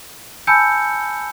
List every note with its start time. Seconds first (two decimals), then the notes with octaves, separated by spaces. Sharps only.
0.47 G#5 A5 B5 E6 G6 C#7